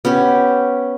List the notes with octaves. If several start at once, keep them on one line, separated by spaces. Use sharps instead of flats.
B3 C#4 G4